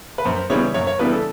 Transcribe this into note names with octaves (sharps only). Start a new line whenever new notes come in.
B4
F#2 C5
C#3 E3 G3 B3 C#5
F#2 C#5
C#5
C#3 E3 G3 B3 B4
A4